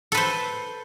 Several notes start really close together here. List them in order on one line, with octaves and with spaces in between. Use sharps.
A4 B4 C5